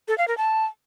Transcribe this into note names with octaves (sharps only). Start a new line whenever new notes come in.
A4
F5
A#4
A5